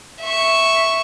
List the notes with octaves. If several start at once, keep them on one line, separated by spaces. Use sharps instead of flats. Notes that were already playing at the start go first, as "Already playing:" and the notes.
E5 C#6